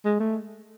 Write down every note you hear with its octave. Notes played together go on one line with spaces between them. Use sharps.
G#3
A3